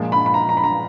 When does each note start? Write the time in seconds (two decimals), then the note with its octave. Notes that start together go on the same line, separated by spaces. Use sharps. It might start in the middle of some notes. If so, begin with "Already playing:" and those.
Already playing: A#2 F3 G#3
0.12 B5
0.26 B5
0.34 A#5
0.49 A#5
0.57 B5
0.64 A#5